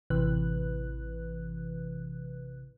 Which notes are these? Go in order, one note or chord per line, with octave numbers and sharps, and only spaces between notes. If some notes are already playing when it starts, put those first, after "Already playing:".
A1 C3 E3 B4 F#6